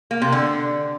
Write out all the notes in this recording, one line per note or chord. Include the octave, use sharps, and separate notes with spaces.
A#3
C3
D3